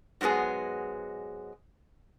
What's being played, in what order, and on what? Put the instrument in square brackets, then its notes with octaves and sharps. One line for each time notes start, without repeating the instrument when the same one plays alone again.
[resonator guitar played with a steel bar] G#2 F#3 G#3 B3 G#4